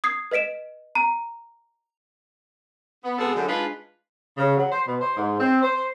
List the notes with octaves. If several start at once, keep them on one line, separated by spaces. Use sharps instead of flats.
D#6 G#6 C7
B4 D#5 B6 D7 E7
A#5
B3
B2 G#3 B3 C4 G#4 A4
F#2 D3
G#3 D4 D#4 F4 B4
C#3
F#3
C5
B2
C5
G#2
C4
C5